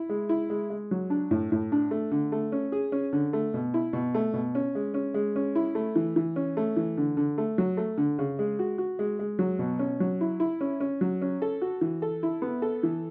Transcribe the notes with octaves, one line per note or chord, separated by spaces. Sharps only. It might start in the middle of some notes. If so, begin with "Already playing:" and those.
Already playing: E4
G#3
E4
G#3
G#3
F#3
D4
A2
A2
D4
A3
D3
A3
C#4
G#4
C#4
D3
A3
B2
E4
B2
A3
B2
C#4
G#3
C#4
G#3
C#4
E4
A3
E3
E3
C#4
A3
E3
D3
D3
A3
F#3
A3
D3
C#3
G#3
F#4
F#4
G#3
G#3
F#3
B2
C#4
F#3
E4
E4
C#4
C#4
F#3
C#4
A4
F#4
E3
A4
E4
B3
A4
E3